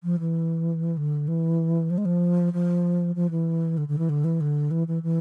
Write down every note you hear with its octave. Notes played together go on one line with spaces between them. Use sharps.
F3
E3
D3
E3
F3
G#3
F3
F3
F3
E3
D3
D3
E3
D3
E3
D3
E3
E3
E3